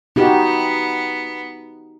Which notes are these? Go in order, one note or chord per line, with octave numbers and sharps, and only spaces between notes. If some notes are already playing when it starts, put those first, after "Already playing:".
B3 D#4 F#4 G4